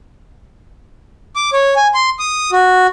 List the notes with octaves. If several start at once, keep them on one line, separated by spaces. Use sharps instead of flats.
D6
C#5
G#5
C6
D#6
F#4